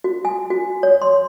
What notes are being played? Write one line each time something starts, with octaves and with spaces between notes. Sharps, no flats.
F#4
G#5
F#4
C#5
C6